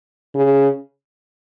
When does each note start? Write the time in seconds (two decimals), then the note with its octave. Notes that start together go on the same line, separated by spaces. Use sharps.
0.35 C#3